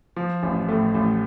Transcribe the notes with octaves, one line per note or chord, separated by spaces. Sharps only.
F3
A1
A2
A1